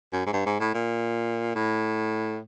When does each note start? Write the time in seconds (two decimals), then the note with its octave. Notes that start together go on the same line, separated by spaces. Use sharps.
0.12 F#2
0.26 G#2
0.33 G2
0.46 G#2
0.60 A2
0.74 A#2
1.55 A2